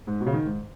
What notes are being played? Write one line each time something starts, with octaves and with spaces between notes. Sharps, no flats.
G#2
B2
C#3
D#3
G#2